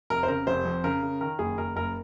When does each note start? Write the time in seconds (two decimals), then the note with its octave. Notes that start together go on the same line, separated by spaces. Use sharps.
0.10 F1 A#4
0.23 C5
0.28 C#3 A#4
0.47 F1 C5
0.65 F2
0.84 C#3 A#4
1.03 C#3
1.21 D#3 A#4
1.39 F#1 G#4
1.58 F#1 A#4
1.76 F#1 A#4